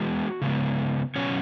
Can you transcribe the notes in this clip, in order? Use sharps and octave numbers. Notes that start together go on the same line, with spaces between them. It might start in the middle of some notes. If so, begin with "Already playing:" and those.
Already playing: E3 G#3 B3 F#4
C#3 G#3 B3
B2 F#3 B3 C#4 C#5